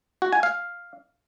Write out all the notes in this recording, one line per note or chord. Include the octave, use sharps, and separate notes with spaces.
F#4
G#5
F5